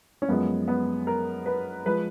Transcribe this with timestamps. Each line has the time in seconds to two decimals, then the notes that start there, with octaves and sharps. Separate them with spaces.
0.22 C#4
0.29 F#2 F3 G#3 B3
0.68 B3
1.07 A#4
1.46 B4
1.86 F3 G#3 B4